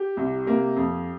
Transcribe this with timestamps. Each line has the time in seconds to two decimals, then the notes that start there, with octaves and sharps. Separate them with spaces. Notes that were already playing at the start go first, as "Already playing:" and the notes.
Already playing: G4
0.17 C2
0.46 C3 A#3
0.76 F2